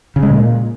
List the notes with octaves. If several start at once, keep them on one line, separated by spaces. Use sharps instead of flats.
C#3
G#3
A#2